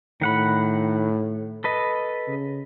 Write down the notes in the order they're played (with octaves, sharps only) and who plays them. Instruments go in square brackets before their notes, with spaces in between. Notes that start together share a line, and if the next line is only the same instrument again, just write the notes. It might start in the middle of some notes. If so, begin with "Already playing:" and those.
[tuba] A2 [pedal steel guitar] D#3 F#5 B5
[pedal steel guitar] A4 B4 D#5
[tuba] C#3